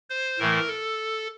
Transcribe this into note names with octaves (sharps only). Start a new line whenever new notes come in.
C5
A2 E3 A3 A#4
A4